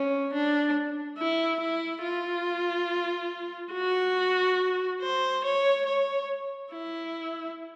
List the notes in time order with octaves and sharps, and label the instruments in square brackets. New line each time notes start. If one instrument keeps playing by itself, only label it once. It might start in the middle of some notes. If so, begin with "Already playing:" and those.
Already playing: [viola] C#4
D4
E4
E4
F4
F#4
C5
C#5
C#5
E4